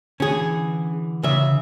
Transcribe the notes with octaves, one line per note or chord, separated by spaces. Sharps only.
D3 E3 C#4 G#4
C#3 E5